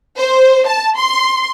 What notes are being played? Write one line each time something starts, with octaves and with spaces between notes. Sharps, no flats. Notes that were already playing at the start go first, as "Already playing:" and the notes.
C5
A5
C6